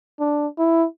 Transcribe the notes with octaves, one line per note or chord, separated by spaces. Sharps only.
D4
E4